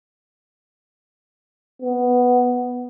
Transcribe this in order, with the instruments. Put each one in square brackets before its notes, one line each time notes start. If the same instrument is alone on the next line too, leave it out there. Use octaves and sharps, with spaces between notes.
[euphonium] B3